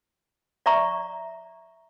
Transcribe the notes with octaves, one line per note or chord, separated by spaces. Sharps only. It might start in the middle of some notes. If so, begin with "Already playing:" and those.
D5 E5 A#5 C#6